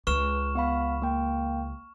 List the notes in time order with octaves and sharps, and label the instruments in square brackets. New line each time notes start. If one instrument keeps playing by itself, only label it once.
[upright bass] C#2 [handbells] B4 [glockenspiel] C#6 F6 E7
[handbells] B3 F5 B5
A#3 G5